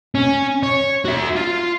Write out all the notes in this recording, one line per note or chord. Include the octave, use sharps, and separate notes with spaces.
C#4
C#5
F#4 E5
F4